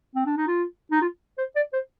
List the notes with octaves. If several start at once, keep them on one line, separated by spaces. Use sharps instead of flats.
C4
D4
D#4
F4
D#4
F4
C5
D5
C5